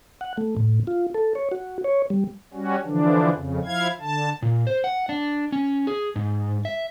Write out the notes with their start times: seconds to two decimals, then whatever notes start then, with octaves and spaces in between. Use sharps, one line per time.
0.21 F#5
0.37 A3
0.57 A2
0.87 F4
1.14 A4
1.35 C#5
1.52 F#4
1.84 C#5
2.10 G3
2.54 G3 C#4 F#4
2.85 D3 E3 F3 D4
3.32 F2 C#3
3.65 F3 E4 F5 G#6
4.00 D3 A5
4.42 A#2
4.67 C5
4.84 F#5
5.09 D4
5.52 C#4
5.87 G#4
6.16 G#2
6.65 E5